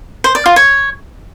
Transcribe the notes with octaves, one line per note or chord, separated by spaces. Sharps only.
C5
D5
F4
C#5